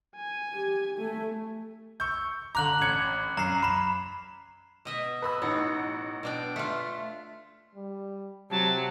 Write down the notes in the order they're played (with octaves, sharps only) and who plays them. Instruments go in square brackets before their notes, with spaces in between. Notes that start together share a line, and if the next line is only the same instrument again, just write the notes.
[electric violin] G#5
[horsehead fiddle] G4
A3
[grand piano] C#6 E6 G6
[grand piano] D3 A#5 [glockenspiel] D6 F#6 F#7
[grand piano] A1 G#6 C#7
[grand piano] F#2 [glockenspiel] A#5 C7
[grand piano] B5 E7
[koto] B2 D#5 E5
[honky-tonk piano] B4 B5 E6
[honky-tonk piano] A1 F#5 [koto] D#4
[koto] B2 D4 G5
[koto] A3 F4 [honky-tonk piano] E5
[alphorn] G3
[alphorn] C3 [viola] F#3 [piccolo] A5